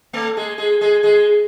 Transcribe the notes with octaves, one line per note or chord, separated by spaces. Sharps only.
A3 A4
G#3 G#4
G#3 G#4
G#3 G#4
G#3 G#4